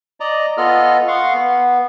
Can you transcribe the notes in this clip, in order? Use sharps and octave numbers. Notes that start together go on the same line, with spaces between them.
D5 D#5 A#5
B3 F4 A4 D#5 F6
F5 F#5 C6 C#6
B3